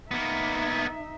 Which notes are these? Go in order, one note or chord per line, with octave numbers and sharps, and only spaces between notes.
A#3 B3 D#4 E5